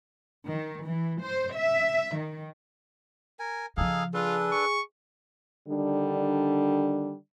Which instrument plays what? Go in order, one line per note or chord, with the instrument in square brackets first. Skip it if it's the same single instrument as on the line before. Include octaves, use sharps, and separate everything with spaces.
[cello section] D#3
E3
C5
E5
D#3
[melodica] A#4 G#5
[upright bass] C#3 F3 [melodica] D#4 G#4 A4 [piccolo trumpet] F5
[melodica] D4 A4 B4 [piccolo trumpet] F4 [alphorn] G#4
[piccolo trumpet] C#6
[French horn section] D3 D#3 G3 D4